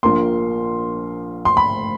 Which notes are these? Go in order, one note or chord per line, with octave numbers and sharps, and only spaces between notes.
A#1 A#2 F3 A#3 C6
C6
B5